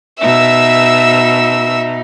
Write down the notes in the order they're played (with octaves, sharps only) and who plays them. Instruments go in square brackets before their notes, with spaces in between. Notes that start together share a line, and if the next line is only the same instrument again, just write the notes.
[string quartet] B2 D#4 [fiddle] E5 E6